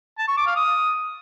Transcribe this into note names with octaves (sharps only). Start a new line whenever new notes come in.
A5
C#6
D6
F5
D#6